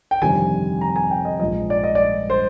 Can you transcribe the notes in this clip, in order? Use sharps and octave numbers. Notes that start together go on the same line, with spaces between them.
G5
G1 F2 C3 D#3 G3 G#5
A#5
G#5
G5
D#5
A#1 G#2 F3 D#5
D5
D#5
D5
C5